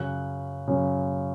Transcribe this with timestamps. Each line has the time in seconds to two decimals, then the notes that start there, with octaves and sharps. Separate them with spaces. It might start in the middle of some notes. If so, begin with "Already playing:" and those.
Already playing: F#2 C#3 F#3 F#6
0.68 F#2 C#3 F#3